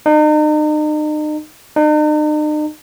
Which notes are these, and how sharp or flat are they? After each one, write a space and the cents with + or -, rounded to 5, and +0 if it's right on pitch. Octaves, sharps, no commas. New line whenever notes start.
D#4 -40
D#4 -45